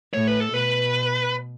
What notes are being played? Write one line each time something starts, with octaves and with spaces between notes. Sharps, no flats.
A2 C#5
B4
A4
B2 B4